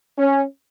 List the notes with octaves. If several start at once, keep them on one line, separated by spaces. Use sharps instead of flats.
C#4